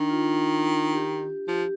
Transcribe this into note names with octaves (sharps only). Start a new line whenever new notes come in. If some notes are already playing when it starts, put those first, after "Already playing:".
Already playing: D#3 D4
F4
G4
F3 G4